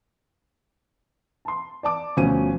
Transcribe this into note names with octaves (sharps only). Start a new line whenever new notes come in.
A5 C6
D5 A5 D6
D2 B2 F3 C#4 D#7